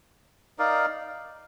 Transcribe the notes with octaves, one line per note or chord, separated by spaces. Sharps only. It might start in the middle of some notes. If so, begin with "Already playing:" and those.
D#4 A#4 D5 F5